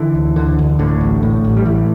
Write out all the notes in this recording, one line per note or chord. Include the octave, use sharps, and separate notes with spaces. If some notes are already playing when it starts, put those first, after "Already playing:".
Already playing: D3 E3
D2
D3
D2
A2 D3
A1
A2
A1
G3
A2 E3